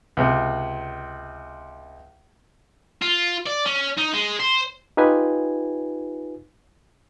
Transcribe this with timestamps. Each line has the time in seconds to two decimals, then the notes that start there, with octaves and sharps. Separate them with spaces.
0.17 C#2 C3
3.02 F4
3.47 D5
3.66 C#4
3.98 D#4
4.14 G#3
4.40 C5
4.97 D#4 F4 G4 B4 G#5